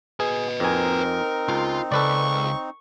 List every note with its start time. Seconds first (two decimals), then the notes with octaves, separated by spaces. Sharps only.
0.20 G#4 B4 D#5
0.60 F2 C4 D#4 A#4 G#5
1.49 C#2 F4
1.92 C#2 A4 B4 D5 C#6